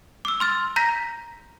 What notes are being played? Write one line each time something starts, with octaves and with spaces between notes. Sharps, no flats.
D6 E6
C6 F6 A6
A#5 G6 A#6 B6